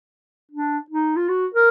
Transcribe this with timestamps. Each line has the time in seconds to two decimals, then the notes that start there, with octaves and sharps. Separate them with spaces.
0.52 D4
0.90 D#4
1.17 F4
1.29 F#4
1.54 A#4